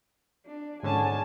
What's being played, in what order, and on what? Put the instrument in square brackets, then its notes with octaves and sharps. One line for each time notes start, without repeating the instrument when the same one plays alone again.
[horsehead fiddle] D4
[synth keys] G#2 D3 C#4 [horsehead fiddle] G#5 A5